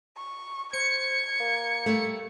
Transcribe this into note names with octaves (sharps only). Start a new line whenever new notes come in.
C#6
C5 G#6 C#7
A#3
G3 A3